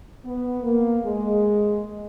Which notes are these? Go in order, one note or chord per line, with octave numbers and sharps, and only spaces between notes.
B3
A#3
G#3